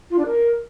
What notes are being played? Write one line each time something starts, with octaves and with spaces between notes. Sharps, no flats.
F4
D4
A#4